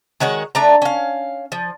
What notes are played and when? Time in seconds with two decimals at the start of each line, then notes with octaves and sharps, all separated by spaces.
0.20 D#3 G#3 F#4 C#5
0.55 A3 D4 A#5
0.82 C#4 F5
1.52 F3